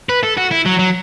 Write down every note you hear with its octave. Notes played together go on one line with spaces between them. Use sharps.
B4
A4
F#4
E4
F#3
F#3